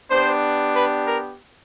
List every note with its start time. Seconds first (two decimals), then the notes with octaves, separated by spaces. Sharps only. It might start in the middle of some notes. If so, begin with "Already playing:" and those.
0.10 B3 D4 G4 C5
0.74 B4
1.06 A#4